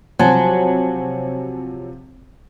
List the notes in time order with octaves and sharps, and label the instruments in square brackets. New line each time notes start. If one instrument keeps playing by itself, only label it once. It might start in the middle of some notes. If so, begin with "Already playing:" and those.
[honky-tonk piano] C3 F3 [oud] F#3 [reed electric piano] C5 G#5 A5